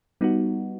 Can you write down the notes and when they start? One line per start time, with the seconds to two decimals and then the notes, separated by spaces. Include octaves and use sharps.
0.21 G3 B3 D#4 F#4